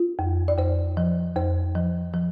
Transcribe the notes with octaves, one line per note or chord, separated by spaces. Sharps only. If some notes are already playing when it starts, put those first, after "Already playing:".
Already playing: F4
F2
D5
F2 C5
F3
F2 C5
F3
F3